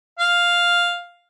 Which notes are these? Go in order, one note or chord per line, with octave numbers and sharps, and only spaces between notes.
F5